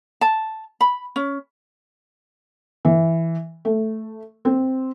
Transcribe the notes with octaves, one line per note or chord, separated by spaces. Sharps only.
A5
B5
C#4
E3
A3
C4